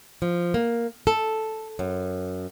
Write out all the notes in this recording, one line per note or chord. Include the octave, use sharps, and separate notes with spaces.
F3
A#3
A4
F#2